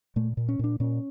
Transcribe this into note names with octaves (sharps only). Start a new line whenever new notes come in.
A#2 A3
A#2
C#4
A#2 D4
A#2 C#4